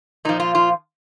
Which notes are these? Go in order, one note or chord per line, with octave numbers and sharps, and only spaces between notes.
A#2 F3 D#4
F4
F4